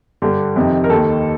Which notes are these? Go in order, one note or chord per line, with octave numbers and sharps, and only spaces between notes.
G2 D3 G4
F2 C3 D#3
A#4
D#2 D#3 A4